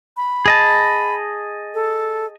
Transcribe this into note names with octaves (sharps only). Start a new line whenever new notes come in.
B5
G#4 D#5 A5
A4